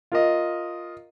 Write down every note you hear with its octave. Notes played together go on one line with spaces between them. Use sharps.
F4 A#4 D#5